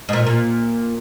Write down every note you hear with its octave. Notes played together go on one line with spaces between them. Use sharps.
G#2
A#2
A#2